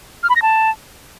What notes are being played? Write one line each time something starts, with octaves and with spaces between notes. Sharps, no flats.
F6
B5
A#6
A5